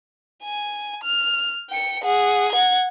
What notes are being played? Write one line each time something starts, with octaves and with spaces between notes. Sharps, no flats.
G#5
F6
G5 C#7
G#4 F#5
F#5 G#6